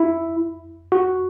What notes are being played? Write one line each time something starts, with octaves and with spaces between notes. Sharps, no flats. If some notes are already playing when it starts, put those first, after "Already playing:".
Already playing: E4
F#4